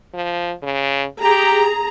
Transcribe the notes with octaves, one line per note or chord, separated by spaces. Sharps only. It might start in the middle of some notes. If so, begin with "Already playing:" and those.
F3
C#3
G4 G#4 A#5